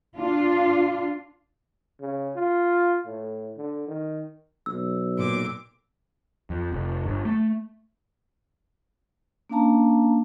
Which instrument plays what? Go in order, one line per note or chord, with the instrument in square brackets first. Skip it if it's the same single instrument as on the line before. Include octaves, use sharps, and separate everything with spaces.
[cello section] D4 F4
[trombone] C#3
F4
A2
D3
D#3
[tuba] B1 [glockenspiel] E6
[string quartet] A#2 D6
[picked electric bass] F2
F1
G1
A3
[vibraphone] A#3 C#4 D4 F5 A5 A#5